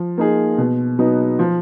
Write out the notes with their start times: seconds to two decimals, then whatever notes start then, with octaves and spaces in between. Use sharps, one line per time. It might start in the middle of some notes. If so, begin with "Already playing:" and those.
Already playing: F3
0.18 A#3 D#4 G#4
0.58 B2
0.99 F#3 B3 D#4
1.39 F3